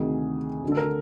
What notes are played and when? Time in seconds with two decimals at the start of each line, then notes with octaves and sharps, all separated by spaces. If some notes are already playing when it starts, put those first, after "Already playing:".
Already playing: D2 C3 D#3 G#4
0.62 D2
0.68 D3 A4
0.77 A#4